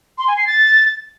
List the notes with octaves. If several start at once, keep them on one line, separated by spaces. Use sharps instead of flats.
C6
G#5
C7
A6